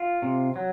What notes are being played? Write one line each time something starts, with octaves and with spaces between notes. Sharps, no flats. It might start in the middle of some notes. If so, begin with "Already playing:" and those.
Already playing: F4
C3
F#3